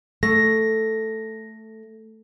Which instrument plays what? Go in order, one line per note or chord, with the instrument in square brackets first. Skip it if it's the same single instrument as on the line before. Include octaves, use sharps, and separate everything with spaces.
[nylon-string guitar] A3 [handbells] A#6